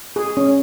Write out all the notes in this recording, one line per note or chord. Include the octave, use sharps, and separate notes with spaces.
G#4
C#4